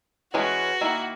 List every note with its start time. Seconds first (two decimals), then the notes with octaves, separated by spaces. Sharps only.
0.34 E3 G#3 C#4 F#4 G#4 B4
0.81 D#3 A#3 E4